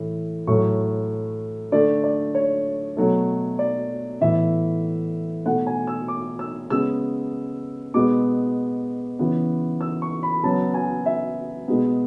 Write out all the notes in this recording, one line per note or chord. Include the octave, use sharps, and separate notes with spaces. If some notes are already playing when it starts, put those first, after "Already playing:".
Already playing: A2 E3
A2 F#3 A3 C#6
D3 A3 D5
D5
C#5
B2 F#3 A3
D5
A2 E3 B3 E5
B2 A3 F#5
G#5
E6
D6
E6
C#3 G#3 B3 E6
B2 G#3 B3 D6
C#3 E3 B3
E6
C#6
B5
C#3 F#3 B3 A5
G#5
E5
B2 G#3 B3